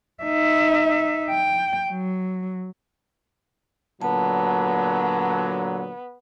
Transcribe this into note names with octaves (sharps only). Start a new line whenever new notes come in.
D#4 E5
G5
F#3
A#2 D3 F#3 B3 A5